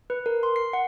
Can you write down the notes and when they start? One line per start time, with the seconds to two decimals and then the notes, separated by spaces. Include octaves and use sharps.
0.10 B4
0.26 A#4
0.43 C6
0.56 C7
0.73 F#5